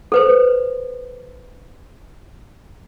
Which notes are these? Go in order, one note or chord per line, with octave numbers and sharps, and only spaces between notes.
A4 B4 C5